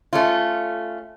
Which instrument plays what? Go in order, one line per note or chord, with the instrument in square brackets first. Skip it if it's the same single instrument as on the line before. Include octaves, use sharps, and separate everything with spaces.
[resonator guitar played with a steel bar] A3 C#4 F4